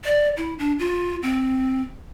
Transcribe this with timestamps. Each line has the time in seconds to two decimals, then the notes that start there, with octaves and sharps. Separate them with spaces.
0.05 D5
0.37 E4
0.59 D4
0.79 F4
1.23 C4